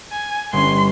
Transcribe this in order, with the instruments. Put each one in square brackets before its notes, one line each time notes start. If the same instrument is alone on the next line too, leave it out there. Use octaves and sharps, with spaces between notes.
[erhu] G#5
[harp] G1 C#4 [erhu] C6